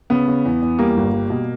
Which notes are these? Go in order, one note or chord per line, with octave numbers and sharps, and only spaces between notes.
C#3 B3
C#3
E2
E2
G3 A#3
G1
G3
B2